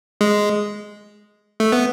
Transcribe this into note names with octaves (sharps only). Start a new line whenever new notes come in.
G#3
A3
B3